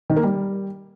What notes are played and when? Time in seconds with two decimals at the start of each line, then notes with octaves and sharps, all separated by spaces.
0.10 D#3
0.16 A#3
0.23 G3